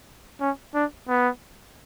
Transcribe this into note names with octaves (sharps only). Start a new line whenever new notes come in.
C#4
D4
B3